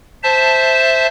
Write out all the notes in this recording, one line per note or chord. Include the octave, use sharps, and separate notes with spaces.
C5 E5 A5